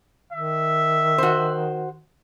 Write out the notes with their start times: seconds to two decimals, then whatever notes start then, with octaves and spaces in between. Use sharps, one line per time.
0.33 D#3 E5
1.18 F#4 C5